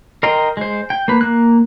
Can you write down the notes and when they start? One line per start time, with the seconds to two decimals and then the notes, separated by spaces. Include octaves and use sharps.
0.23 A#4 D#5 G5 C6
0.57 G#3 C5
0.90 G5
1.08 A#3 B4
1.21 A#3 F#6